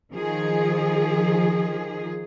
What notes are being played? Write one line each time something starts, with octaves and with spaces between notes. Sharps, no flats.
D#3 F3 G#4